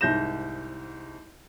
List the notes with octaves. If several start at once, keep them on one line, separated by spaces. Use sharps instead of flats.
C2 G#2 G6 A#6 E7